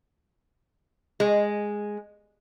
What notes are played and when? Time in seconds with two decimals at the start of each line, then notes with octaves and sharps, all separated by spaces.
1.20 G#3